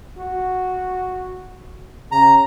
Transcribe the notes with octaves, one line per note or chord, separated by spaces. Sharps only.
F#4
C#3 A#5